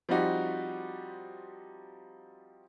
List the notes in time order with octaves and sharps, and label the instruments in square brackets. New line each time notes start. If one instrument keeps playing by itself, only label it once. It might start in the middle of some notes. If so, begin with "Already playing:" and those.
[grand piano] F3 G3 C4 D#4 F#4 G4